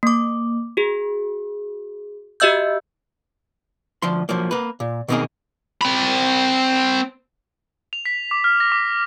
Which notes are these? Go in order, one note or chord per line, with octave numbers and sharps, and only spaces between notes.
A#3 D6
F#4 G#4
F#4 G4 D#5 E5 E6 G6
D2 F3 C6
F3 F#3 A#3
A#3 B4
A#2
B2 D#3 A#3 C4 D#4 G#4
C4 B5
F7
B6
D6
F6
A#6
D6